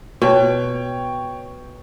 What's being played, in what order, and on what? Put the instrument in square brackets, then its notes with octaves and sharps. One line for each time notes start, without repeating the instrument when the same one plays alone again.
[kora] B2 [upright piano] C#5 G5